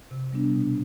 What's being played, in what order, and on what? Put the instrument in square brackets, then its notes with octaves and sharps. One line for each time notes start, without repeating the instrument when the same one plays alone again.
[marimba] C3
G3 B3 D4
B2